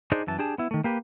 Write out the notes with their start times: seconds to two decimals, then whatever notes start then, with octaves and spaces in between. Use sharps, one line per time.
0.12 D4 D#4 G#4 C5 D5
0.27 F#2 E3 A5
0.39 D4 G4 G#4 A5
0.58 B3 E4
0.71 D#3 A3
0.84 A#3 G4 B4